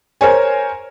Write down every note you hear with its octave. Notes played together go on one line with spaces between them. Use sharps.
A#4 C5 C#5 G#5